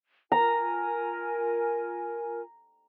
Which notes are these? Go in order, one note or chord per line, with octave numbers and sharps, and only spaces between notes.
F4 A#4 G#5 A#5